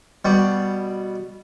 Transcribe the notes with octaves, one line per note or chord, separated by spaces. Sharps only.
B2 G3